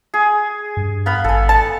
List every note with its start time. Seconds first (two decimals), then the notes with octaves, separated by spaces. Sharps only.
0.14 G#4
0.77 G2
1.06 B3 F5 B5
1.24 G#1 A4 G#5
1.49 A5